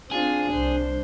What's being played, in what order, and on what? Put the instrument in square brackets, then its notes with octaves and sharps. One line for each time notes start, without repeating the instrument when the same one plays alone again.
[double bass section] C4 [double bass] D4 [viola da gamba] F4 [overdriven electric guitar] G#4
[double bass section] C2 [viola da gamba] C5